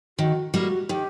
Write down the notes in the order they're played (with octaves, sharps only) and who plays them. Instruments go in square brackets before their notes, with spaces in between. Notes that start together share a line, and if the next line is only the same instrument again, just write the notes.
[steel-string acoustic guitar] D#3 [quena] F#4
[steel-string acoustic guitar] G3 A#3 [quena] F#4
[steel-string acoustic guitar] D#3 [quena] G4